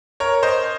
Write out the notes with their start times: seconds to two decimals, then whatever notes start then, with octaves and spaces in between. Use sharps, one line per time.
0.20 A#4 C#5
0.43 C5 D#5